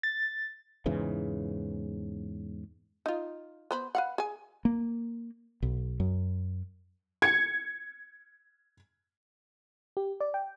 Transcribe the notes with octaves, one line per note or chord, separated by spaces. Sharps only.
A6
E2 G#2 C#3 E3
D#4 F4
B3 C5 B5
B4 F5 F#5
G#4 G#5
A#3
B1
F#2
G#6 C#7
G4
D5
G5